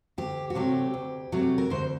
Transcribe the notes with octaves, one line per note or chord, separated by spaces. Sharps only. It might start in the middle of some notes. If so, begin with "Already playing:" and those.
D2 G4
F#4
C3 F#3 A3 G4
D2
C3 F#3 A3
A#4
D2 C5